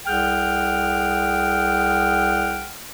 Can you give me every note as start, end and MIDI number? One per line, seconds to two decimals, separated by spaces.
0.06 2.71 36
0.06 2.71 68
0.06 2.71 78
0.06 2.71 79
0.06 2.71 89